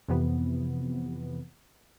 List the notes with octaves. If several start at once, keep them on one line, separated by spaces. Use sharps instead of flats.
F2 C3 E3 B3